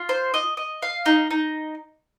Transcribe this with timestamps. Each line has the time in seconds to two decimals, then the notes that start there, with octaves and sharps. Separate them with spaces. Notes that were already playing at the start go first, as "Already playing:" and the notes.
Already playing: F4
0.09 C5
0.34 D#5
0.57 D#5
0.82 F5
1.06 D#4
1.31 D#4